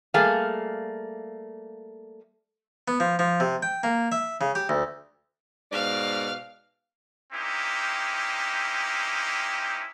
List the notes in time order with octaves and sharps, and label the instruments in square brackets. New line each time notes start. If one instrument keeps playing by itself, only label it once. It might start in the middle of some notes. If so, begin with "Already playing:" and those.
[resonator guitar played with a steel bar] G3 A3 A#3 G#4 F5
[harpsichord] B3
F3
F3
C3
G5
A#3
E5
C#3
G4
D2
[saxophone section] G#2 B2 D5 [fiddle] F5
[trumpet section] A#3 C4 C#4 D#4 E4 G4